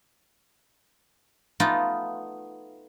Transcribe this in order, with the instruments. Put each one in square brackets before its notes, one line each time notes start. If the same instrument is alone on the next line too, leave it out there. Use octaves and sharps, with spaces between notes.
[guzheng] A3 B3 D#4 F4